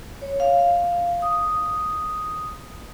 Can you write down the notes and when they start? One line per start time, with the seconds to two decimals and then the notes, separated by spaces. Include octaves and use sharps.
0.22 C#5
0.40 F5
1.22 D#6